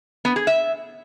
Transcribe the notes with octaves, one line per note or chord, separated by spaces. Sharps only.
B3
G#4
E5